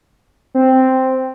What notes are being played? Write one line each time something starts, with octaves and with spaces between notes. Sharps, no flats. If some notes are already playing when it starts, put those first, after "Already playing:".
C4